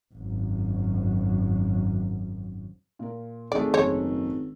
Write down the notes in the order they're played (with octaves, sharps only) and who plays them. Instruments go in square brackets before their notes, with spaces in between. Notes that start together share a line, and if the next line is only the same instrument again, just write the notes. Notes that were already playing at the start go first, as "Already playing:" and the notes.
[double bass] G#1 F#2
[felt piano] A#2 A#4
[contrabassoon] G#1 [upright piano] G#3 A3 [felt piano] D4 G#4 [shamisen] D5
[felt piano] F#1 [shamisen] C5 C#5